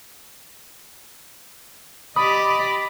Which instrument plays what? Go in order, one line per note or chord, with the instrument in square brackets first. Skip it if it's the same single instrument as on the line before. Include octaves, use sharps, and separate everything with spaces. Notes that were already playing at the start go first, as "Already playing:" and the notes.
[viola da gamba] G4 D5 D#5 [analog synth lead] B5 [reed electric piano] D#6